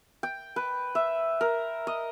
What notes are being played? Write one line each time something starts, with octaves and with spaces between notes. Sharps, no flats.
G5
B4
E5
A#4
D#5